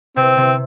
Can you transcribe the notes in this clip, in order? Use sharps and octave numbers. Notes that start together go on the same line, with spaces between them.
C3 C4
C3